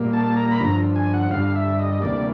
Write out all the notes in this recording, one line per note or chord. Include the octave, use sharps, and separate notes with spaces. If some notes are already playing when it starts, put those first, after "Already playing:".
Already playing: A#2 G3 A#3
A5
A#5
B5
G2 D3 F3 A#5
G#5
F#5
G2 D3 G3 F5
E5
D#5
D2 C3 E3 G3 A#3 D5